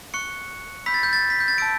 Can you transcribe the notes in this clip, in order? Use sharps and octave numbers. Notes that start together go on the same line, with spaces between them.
C#6 F#6 C#7
B5 E6 G6 B6
A6
G6
A6
B6
G6
A6
A5 E6 G6 D7